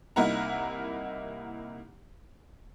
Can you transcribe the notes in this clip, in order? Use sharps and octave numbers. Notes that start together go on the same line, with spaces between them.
C2 A#3 D#4 E4 F#5 A#5